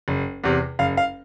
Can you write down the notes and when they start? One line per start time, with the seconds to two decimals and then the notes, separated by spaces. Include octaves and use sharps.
0.08 F#1
0.44 E2 C3
0.79 F#1 F5
0.97 F5